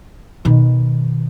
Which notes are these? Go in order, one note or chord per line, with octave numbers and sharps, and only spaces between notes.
B2 D#3